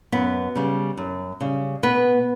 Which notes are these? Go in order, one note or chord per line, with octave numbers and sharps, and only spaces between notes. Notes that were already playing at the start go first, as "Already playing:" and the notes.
F#2 B3 B4
C#3 G3
F#2
C#3 G3
B2 B3 B4